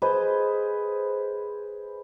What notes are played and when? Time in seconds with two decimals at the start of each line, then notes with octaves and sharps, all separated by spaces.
0.02 G#4 B4 C5 D#5